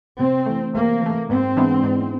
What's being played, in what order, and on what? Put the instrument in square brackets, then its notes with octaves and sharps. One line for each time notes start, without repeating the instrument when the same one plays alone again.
[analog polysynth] C3 [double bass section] C4
[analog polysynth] E3 A3
[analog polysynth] C3 [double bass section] A#3
[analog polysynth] E3 A3
[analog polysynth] G#2 [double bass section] C4
[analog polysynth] E3 G#3 B3 D4
G#2